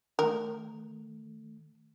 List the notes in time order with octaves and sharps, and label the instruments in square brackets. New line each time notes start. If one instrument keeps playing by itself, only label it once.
[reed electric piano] D#3 A3 [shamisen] A#4